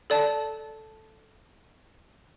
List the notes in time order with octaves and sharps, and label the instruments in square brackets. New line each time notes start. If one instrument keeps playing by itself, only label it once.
[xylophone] A4 D5 A5